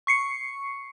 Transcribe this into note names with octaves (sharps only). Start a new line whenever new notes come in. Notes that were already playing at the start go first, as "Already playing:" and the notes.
C#6 C7 C#7